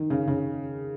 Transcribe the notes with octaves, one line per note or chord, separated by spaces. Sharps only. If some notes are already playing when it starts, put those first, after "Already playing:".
Already playing: D#3
C#3
C#3